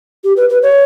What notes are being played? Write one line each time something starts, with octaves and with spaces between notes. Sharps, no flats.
G4
B4
B4
C#5